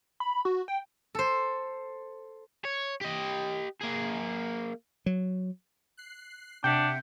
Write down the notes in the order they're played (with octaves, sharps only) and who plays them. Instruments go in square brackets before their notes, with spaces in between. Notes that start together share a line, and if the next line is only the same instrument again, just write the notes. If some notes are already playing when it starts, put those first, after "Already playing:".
[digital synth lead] B5
F#4
G5
[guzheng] A4 C5
[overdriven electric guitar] C#5
G4 D#5
A#3 G#4
[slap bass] F#3
[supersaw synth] F#6 C7
[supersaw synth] C3 [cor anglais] D4 [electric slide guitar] E5 F#5 G5 [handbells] G6